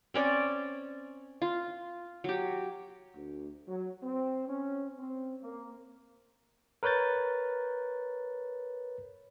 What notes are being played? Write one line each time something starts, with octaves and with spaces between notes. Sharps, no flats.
C4 C#4 D5
F4
F#3 G4
D2
F#3
C4
C#4
C4
A#3
A#4 B4 C#5 G6 A6